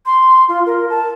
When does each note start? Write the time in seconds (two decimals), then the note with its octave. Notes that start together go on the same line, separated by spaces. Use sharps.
0.06 C6
0.49 F4
0.66 A#4
0.90 A5